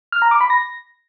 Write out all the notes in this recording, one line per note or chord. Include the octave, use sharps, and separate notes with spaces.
F6
A#5
D6
B5
A#6